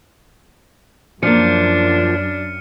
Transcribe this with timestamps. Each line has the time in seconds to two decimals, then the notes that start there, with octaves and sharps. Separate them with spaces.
1.23 F#2 F3 A#3 D4 F6 C#7 D#7